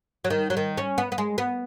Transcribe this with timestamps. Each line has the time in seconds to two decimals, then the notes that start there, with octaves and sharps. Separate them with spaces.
0.24 F#3
0.30 D#3
0.50 F#3
0.57 D#3
0.77 C#4
0.98 B3
1.12 B3
1.18 G#3
1.38 B3